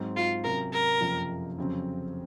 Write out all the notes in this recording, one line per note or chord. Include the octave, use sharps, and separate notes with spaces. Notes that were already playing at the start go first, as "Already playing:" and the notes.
Already playing: G#2 F#3 C4
F4
C3 F#3 C#4 A#4
A#4
F#1 F2 C3 F3 A#3
F2 C#3 F#3 C4